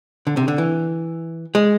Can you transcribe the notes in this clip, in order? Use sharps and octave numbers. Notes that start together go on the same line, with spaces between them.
D3
C3
D3
E3
G#3